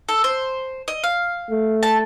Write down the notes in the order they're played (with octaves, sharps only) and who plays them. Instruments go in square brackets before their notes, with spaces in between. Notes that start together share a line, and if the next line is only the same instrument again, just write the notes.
[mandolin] A4
C5
D#5
F5
[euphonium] A3
[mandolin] A5